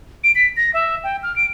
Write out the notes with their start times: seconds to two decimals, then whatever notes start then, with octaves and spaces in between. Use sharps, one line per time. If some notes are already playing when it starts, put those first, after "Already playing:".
0.24 D7
0.35 B6
0.57 A#6
0.74 E5
1.04 G5
1.23 F6
1.36 D7